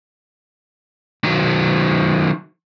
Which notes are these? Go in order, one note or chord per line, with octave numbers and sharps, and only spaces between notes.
D#3 F#3